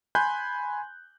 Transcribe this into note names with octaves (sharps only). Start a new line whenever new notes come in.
G#5 B5 C6 F#6 G6